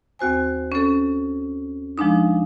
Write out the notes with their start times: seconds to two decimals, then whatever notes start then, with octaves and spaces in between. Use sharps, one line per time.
0.19 D#2 C4 F#4 C5 G#5
0.72 C#4 A4
1.98 F3 G#3 D4 D#4